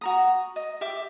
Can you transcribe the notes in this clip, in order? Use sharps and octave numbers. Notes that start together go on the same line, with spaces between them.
F#4 A#5 D#6
D#5
G4 E5 D6